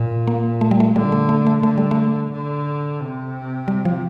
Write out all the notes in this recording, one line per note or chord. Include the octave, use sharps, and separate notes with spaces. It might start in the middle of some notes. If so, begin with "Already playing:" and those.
Already playing: A#2
A#3
A3
G3
A3
D3 G3
A3
A3
A3
D3 A3
G3
A3
D3
C3
G3
F3